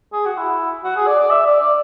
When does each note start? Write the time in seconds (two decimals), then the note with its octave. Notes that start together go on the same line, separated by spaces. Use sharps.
0.13 G#4
0.26 F#4
0.38 E4
0.84 F#4
0.96 G#4
1.07 D5
1.19 D5
1.31 E5
1.46 D5
1.61 D5